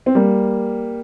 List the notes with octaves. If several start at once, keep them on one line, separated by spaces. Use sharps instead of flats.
C4
G3 A#3